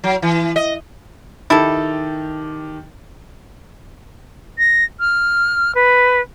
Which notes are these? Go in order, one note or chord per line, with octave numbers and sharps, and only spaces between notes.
F#3
E3
D#5
D#3 E4 G4 A4 A6
A#6
F6
B4